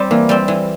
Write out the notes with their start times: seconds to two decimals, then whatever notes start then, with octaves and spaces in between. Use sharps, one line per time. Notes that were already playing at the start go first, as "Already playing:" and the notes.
Already playing: G3 C4
0.11 E3 A#3
0.29 G3 C4
0.48 E3